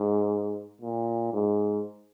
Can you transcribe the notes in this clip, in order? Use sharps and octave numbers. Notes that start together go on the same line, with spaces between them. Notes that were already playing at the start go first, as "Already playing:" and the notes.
Already playing: G#2
A#2
G#2